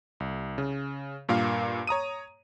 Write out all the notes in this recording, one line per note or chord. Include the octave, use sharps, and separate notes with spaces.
C2
C#3
G2 A#2 A#3 F5
C#5 A#5 D#6 D#7